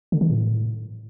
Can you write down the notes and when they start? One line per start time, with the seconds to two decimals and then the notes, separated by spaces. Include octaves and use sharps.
0.12 D3
0.21 D#3
0.30 A2